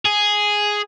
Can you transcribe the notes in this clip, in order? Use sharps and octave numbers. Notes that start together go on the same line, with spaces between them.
G#4